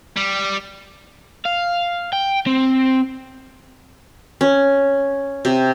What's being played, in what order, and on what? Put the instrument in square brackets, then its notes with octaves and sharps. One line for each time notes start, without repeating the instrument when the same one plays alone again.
[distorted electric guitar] G3
[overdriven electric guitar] F5
G5
C4
[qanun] C#4
C3